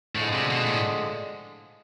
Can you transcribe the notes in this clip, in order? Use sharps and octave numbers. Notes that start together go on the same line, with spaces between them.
A2 D3 F3 G#3
C3
B2
A2